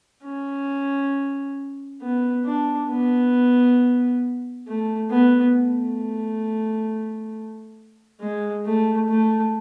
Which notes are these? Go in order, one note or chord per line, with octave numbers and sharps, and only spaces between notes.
C#4
B3
D4
B3
A3
B3
A3
G#3
A3
A3